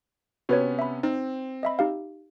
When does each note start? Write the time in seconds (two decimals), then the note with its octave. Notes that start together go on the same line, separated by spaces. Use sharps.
0.49 C3 B3 C#4 F#4 B4 C#5
0.79 E5 B5
1.03 C4 D#4
1.63 D#5 E5 B5
1.79 D#4 G4 F5